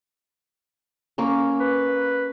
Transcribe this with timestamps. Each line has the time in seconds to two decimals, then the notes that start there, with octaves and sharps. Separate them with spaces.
1.18 A#3 C#4 A#4
1.60 B4